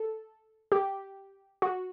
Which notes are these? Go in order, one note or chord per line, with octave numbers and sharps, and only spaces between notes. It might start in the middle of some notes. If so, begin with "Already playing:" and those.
Already playing: A4
G4
F#4